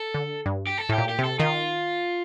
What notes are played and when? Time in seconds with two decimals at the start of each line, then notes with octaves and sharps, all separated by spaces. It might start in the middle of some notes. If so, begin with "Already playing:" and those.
Already playing: A4
0.14 D3
0.46 G2
0.67 G4
0.78 A4
0.89 A2
0.93 G4
0.98 A#2
1.09 G4
1.19 C3
1.24 A4
1.40 D#3 F4